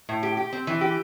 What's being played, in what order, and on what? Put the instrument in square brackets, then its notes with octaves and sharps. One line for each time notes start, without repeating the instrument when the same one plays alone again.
[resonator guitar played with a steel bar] A2
G4
G4
C4
E3
G4